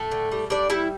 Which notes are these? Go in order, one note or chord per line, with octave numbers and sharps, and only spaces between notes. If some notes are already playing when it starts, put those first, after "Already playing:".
Already playing: A2 A3 A4
D3
G3
G3 D4 D5
G3 E4 E5